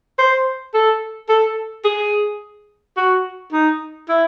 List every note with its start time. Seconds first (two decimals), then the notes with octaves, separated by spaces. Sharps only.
0.18 C5
0.74 A4
1.29 A4
1.85 G#4
2.97 F#4
3.52 D#4
4.09 E4